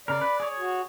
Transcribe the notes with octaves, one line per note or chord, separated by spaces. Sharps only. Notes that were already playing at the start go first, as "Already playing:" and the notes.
C#3 A#4 D5
B4
G#4 C#5
F#4